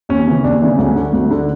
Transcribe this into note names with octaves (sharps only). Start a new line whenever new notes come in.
D#2 C#4
C#3 E3
D#2 D4
C#3 E3 D4
D2 C#4
D3
D2
D3